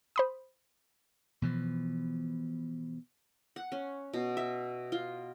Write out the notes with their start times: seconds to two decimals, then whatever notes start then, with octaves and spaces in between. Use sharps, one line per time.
0.16 C5 B5 D#6
1.42 B2 E3 F3
3.56 F#5
3.72 C#4
4.13 B2
4.37 E5
4.92 F4